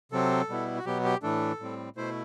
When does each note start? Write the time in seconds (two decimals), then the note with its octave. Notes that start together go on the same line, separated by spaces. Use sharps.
0.12 C3 F#3 C4 A4
0.49 B2 G3 B3 E4
0.78 F#4
0.85 B2 F#3 B3 G4
1.04 G4
1.22 A2 E3 A3 D4 A4
1.60 A2 G3 C4
1.96 B2 A3 E4 C5